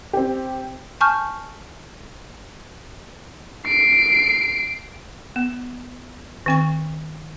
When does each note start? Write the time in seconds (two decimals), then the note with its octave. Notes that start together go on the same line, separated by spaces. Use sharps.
0.13 C4 G4
1.01 G#5 A5 C#6 F6 G6
3.67 C7 D7
5.36 B3
6.46 D#3 C4 C#6